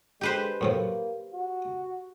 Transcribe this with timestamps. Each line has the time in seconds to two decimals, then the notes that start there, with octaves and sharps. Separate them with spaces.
0.21 G#3 G4 B4 C5
0.61 F#2 A2 F3 A#3
1.34 F#4